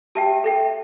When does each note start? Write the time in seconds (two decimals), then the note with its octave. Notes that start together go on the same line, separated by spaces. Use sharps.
0.15 G4 E5 G5 A5
0.44 A4 E5 G5